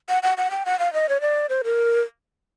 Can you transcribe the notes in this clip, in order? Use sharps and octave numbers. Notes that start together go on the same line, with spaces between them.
F#5
F#5
F#5
G5
F#5
F5
D#5
C#5
D5
C5
A#4